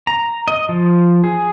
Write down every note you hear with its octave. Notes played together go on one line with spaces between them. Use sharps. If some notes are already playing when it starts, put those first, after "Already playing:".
A#5
D#5
F3
G#4